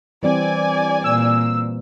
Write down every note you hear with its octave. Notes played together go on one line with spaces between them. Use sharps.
E3 G3 C4 D5 G#5
A#2 E6